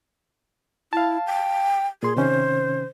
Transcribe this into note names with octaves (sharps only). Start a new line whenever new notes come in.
E4 F5 A5
G5
A#2 G#4 C6
C3 D#3 C#4 C5